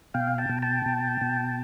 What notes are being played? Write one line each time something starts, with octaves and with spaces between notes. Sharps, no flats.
B2 F5 G5
G5 A5
B2
G5 A5
B2
B2